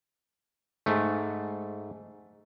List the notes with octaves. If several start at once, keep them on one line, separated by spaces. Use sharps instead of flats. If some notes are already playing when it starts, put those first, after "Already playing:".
G#2 A3